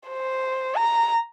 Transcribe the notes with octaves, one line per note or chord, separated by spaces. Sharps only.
C5
A#5